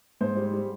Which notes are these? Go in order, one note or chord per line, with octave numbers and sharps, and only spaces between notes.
G#2 C5
G3
G3